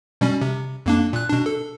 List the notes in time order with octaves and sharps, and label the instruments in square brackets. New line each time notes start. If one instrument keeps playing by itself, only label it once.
[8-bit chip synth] B2 G3 C#4
C3
F2 A#3 D4
A#2 F#6
B2 D4
A4